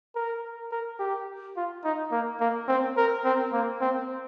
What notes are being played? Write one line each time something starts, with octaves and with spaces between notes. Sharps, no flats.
A#4
A#4
G4
F4
D#4
A#3
A#3
C4
A#4
C4
A#3
C4